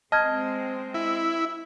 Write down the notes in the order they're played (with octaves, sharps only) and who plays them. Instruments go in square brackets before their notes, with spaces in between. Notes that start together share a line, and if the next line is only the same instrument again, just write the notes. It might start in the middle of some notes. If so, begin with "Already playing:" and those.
[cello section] G#3 C4 [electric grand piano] D#5 [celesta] A5 F6 G#6
[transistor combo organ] E4